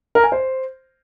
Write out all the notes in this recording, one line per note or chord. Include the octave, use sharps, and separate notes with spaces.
A#4
G#5
C5